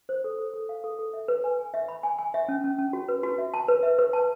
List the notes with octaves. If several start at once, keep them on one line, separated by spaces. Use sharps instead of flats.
C5
A4
A4
A4
F5
A4
A4
E5
B4
G#5
G#5
E5
B5
G#5
G#5
E5
C#4
C#4
C#4
F#4
B4
F#4
E5
A5
B4
E5
B4
A5